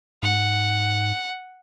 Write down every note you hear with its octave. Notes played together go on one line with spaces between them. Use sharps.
G#2 F#5